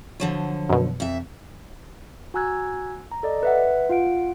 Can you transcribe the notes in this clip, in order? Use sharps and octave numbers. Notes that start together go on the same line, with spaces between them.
D3 F3 F#3
F#2 B2
F2 E5
F#4 G#5 A#5 E6 F#6 G#6
A#5
A4 D5 D#5
B4 E5 F#5
F4 F5 F#5 D7